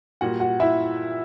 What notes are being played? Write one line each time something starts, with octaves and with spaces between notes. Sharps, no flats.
A#2 G3 F#4 F#5
F#4 F#5
E4 E5